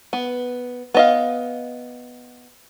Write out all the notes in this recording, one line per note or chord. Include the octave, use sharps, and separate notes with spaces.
B3
B3 D#5 F5